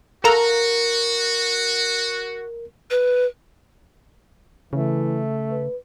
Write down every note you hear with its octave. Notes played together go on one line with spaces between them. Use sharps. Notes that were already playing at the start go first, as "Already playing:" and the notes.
F#4 A4 A#4 F5 A#5
B4
C#3 E3 A3
B4